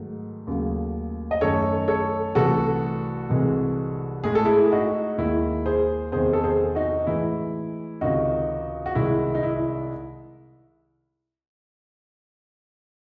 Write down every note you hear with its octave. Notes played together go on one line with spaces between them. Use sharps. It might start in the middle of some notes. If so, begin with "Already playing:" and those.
Already playing: G#2 D#3 F#3 A3
D#2 C#3 F#3 A3
D#5
F#2 D#3 A3 A4 C#5
A4 C#5
C2 C3 E3 A3 F#4 A4
C2 C3 E3 G#3
A2 G#3 G#4
A4
E4 G#4
D#4 F#4
D#2 D#3 G#3 E4
G#4 C5
E2 C3 D#3 G#4 C5
A4
G#4 C5
D#4 F#4
A2 E3 G#3 E4
C#2 C3 D#3 D#4 F#4
F#4
C2 C3 D#3 G#3 E4
D#4
E4